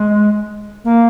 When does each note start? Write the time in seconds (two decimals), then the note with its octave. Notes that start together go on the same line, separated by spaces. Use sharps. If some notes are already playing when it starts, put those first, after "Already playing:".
Already playing: G#3
0.84 A#3